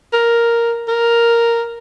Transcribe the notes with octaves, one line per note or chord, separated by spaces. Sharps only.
A#4
A#4